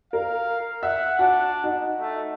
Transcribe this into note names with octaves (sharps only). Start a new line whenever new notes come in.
A#4 F5
E5 F#5
D4 F#4 F#5
D#4 F#4
A3